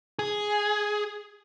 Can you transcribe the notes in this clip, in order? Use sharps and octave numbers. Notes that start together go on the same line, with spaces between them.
G#4